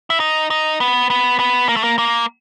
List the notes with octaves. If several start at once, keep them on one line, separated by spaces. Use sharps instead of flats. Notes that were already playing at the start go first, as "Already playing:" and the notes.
E4
D#4
D#4
B3
B3
B3
A#3
A3
A#3
A#3